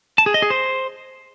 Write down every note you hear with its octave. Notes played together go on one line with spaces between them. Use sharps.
A5
G#4
D#5
G#4
C5